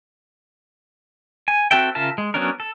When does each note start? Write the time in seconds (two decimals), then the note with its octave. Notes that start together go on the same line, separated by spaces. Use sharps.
1.48 G#5
1.71 C4 F#4 A4 E5 G5
1.95 C#3 F4 A#4 E5 A5
2.18 G#3
2.34 F#3 B3 C#4 D4 A#4
2.60 A4